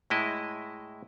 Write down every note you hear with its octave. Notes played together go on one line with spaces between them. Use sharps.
A2 G#3 E4 D#5